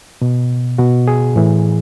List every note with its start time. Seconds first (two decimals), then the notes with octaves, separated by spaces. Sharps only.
0.22 B2
0.78 B2 F#4
1.08 G#4
1.36 A2 E3